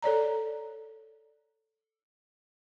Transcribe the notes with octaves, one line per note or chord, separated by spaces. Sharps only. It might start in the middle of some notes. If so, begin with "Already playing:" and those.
A4 C#5 D5 A#5